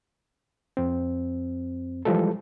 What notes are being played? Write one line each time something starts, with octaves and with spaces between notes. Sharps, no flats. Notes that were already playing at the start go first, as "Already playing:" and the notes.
F2 C4
E3 F3 G3 G#3 A4